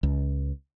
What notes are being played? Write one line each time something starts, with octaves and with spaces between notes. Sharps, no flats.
C#2